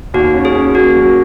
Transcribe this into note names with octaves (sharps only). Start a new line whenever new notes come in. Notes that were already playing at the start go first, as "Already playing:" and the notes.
D#2 F#4
C#4
G#4
C#4
A#3 F#4
F#3